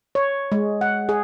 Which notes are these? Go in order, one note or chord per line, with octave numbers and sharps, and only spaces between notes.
C#5
G#3
F#5
G#4